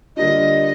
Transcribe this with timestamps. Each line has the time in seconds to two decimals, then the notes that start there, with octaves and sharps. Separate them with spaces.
0.17 D3 G3 A#3 D4 F4 D#5